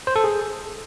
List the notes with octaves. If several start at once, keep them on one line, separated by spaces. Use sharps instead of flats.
C5
A4
G#4